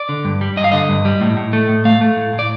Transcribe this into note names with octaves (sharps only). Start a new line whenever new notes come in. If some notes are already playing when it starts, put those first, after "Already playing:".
Already playing: D5
D3
G2
G3
G2 D#5
F5
D3 D#5
G2
G3
A2
A2
A3
A2
A3 F5
A3
A2
A2
D5